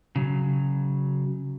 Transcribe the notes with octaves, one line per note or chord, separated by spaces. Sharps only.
C#3 F#3